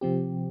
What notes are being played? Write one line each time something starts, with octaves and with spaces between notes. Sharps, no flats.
C3 F3 C4 G4